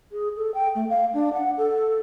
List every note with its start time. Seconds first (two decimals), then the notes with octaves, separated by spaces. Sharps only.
0.12 G#4
0.37 A4
0.54 G5
0.75 A3
0.89 F5
1.14 D4
1.34 F#5
1.58 A4